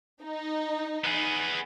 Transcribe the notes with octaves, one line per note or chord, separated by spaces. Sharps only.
D#4
B3 G#4